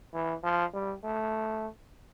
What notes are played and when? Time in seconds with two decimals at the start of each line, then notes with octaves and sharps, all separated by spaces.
0.13 E3
0.43 F3
0.74 G3
1.04 A3